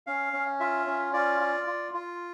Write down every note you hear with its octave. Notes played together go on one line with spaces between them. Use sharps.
C#4 F5
C#4
F4 E5
C#4
F4 D5
F4
F4
F4